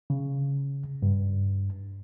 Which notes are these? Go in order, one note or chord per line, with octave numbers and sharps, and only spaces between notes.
C#3
G2